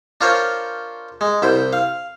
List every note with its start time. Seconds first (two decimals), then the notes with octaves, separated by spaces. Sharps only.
0.21 D4 F4 A#4 C5 C#5
1.21 G#3
1.42 C2 E4 C5
1.73 F5